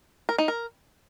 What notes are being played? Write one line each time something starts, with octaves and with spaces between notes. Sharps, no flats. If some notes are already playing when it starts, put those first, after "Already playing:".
A#4
D#4
A#4